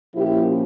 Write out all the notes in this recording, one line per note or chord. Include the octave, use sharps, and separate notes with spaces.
A#2 F3 A#3 C#4 E4 G4